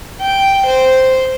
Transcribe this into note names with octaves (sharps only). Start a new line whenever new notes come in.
G5
C5